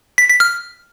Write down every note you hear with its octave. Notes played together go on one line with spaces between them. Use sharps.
B6
B6
F6